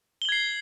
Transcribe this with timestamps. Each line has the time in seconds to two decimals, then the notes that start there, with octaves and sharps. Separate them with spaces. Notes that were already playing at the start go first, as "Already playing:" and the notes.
0.22 G7
0.25 F#7
0.29 G#6
0.32 C7